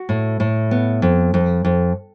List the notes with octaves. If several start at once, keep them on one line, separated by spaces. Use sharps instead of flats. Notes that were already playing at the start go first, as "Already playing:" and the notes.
Already playing: F#4
A2
A2
B3
F2
F2
F2